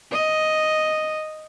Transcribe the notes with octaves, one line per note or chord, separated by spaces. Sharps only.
D#5